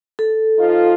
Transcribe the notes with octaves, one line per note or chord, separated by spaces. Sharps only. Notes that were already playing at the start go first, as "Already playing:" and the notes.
A4
F3 D#4 F4